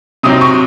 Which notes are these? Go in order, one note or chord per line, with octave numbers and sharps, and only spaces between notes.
C3 F#3 C4 D#4 D#6
C#6